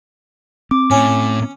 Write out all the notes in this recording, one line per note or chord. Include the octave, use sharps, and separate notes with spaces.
C4 D6
A2 C#4